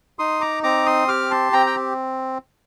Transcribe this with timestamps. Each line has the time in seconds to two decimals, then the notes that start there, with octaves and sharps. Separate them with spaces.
0.19 D#4 C6 D#6
0.41 A#5 D6
0.63 C4 A#5 D6
0.86 C6 D#6
1.08 G4 D6 F6
1.31 A5 C6
1.53 C4 G5 A#5
1.66 G5